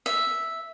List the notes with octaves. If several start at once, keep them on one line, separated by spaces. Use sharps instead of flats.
E5